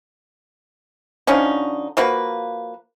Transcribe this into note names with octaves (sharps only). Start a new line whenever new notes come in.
D3 F3 C#4 D#4
F3 A#3 F#4 B4